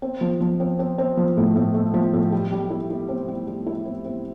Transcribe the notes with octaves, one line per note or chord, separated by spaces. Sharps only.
C4
F3
F3
C4
C4
C4
F3
A2
A2
A3
F3
A2
G3
G3
E4
E4
C4
G3
G3
E4
C4
C4